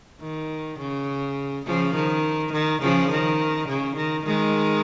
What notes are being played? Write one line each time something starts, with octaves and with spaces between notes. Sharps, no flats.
D#3
C#3
C#3 F3
D#3
D#3
C#3 F3
D#3
C#3
D#3
D#3 G#3